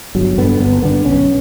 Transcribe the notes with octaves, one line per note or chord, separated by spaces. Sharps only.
G1 F#3
G2 D3 B3
G1 B3
G2 D3 B3
B1 C#4